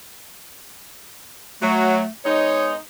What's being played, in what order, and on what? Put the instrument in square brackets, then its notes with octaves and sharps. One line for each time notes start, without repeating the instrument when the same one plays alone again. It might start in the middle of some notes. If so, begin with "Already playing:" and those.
[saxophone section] F#3 [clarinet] A3
[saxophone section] G#3 B3 D#4 [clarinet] C#5